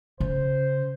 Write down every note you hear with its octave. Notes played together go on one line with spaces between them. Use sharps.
C#3 C5